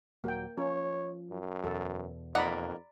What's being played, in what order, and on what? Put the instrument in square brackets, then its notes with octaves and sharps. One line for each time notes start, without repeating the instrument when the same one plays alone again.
[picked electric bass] D#1 F#3 [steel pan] A#3 G5
[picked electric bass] F3 [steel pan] C#4 [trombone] C#5
[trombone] F#2
[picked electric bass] E2 B2 [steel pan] A4
[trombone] F2 [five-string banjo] A#3 D#4 F#5 [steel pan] D5 A#5 B5